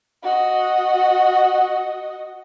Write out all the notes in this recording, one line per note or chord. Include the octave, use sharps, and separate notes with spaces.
F#4 D#5